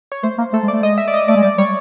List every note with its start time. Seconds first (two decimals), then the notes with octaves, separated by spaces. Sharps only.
0.12 C#5
0.23 A3 C5
0.38 A#3
0.53 A3 A4
0.63 G#3
0.68 A3 D5
0.83 G#3 D#5
0.98 E5
1.08 D5
1.14 D#5
1.28 A3 D5
1.36 G#3
1.43 G3 D5
1.58 G3 C#5